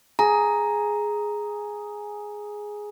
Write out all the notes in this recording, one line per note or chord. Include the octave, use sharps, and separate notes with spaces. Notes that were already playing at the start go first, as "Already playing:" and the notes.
G#4 A#5